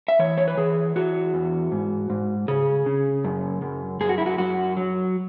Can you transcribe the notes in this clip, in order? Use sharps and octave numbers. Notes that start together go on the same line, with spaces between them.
E5
E3 C#5
C#5
B4
E3 G#4
E3 F#4
E2
G#2
G#2
C#3 G#4
C#3
F#2
F#2
F#2 G#4
F#4
E4
F#4
F#2 F#4
F#3